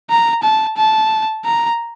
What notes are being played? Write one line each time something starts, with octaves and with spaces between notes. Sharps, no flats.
A#5
A5
A5
A#5